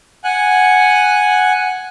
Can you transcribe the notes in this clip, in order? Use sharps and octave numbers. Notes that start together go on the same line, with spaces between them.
F#5 G#5 F#6